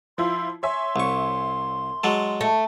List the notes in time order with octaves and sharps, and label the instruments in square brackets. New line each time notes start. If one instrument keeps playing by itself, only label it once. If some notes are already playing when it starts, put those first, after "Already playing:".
[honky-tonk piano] F3 E4 F4 [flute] C6
[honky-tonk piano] C#5 E5 G#5 [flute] C6
[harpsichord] C2 C#6
F#3 G#3 A4
[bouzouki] A3